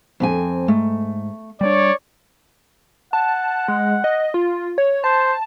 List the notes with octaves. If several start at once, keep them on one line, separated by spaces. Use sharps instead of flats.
F2 C4 G#5
G#2 A3
G3 G#3 D4 C#5 D5
F#5 A5
G#3
D#5
F4
C#5
C5 A5